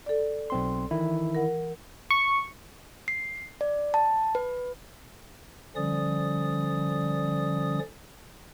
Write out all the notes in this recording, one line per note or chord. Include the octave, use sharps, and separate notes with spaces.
A4 D5
B1 C4 C6
D#3 E3 E4
A#4 F#5
C#6
C7
D5
A5
B4
D3 F3 G3 C#4 D5 D#6